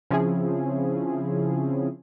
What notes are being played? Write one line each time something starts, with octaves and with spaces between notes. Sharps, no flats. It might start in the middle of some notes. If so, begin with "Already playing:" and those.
C#3 F3 C4 C#4 E4 G#4